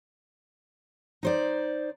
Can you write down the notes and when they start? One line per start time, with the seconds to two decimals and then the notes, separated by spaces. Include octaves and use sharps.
1.23 D#4 C5 D5